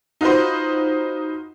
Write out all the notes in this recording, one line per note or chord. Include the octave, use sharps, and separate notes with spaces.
D#4 F4 F#4 B4 C5